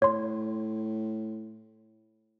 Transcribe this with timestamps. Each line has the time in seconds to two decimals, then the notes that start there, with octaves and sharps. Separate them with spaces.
0.02 A2 C#5 C6